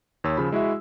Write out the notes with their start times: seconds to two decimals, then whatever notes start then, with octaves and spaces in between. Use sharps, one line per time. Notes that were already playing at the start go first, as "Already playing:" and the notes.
0.24 D#2 C#5 E6
0.37 C#3 F3 B5
0.52 G#3 E4 F#4 E5